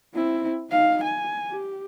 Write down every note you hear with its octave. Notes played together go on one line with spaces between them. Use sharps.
C4 E4
D#4 F5
G#5
G4